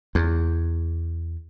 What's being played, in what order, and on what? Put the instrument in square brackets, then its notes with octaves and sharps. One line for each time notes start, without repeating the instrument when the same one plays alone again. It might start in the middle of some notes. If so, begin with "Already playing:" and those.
[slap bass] E2